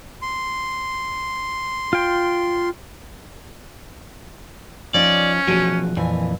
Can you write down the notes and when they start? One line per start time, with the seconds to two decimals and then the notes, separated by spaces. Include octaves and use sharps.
0.22 C6
1.93 F4 G5
4.94 F3 C#4 D#4 D5
5.47 B1 E2 F3 F#4 G#4
5.97 F2 A#2 E3 G#5